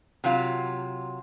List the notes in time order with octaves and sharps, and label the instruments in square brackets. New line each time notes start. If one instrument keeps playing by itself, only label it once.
[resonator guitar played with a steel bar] C3 F#3 F4